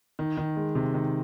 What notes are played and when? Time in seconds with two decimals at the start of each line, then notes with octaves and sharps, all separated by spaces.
0.19 D#3
0.37 D#3
0.57 G#3
0.75 C3
0.94 D#3